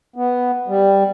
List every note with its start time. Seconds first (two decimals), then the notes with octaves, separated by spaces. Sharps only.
0.16 B3
0.68 G3